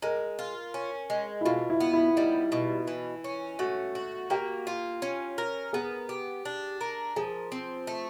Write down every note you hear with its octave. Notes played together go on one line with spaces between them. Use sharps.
G#3 A#4
F4
C#4
G#3
E4
B2 F4
E4
B3
E4
G3 D#4
B2
E3
C#4
A3 F#4
F#4
A#3 G4
F4
C#4
A#4
B3 G#4
G4
D4
A#4
F3 G#4
C4
A3